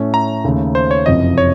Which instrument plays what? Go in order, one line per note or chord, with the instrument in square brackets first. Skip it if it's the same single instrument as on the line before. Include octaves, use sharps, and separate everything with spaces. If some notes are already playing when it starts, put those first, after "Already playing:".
Already playing: [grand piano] A2 A3 C#4 A4
[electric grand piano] A#5
[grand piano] D#2 C#3 A3
[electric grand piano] C5
C#5
[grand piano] F#1 F2 C3 [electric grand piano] D#5
[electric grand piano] C#5